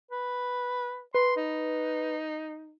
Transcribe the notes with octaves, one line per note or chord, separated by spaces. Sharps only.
B4
B4 C6
D#4